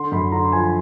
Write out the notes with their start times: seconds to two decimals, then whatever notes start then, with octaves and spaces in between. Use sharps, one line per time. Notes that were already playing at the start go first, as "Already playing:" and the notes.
Already playing: D3 C6
0.12 F#2 B5
0.32 D3 A#5
0.53 F3 G#5